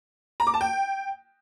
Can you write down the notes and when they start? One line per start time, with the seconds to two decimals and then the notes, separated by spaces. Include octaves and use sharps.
0.40 A#5
0.47 D6
0.54 A5
0.61 G5